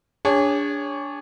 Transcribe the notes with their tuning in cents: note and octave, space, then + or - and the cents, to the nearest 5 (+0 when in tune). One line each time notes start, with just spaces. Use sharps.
D4 -20 G#4 -35 C#5 +0